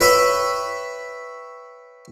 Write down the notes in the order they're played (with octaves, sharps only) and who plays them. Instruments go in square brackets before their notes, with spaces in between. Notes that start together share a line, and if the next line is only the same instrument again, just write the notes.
[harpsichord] B4 C#5 E5 G5 B5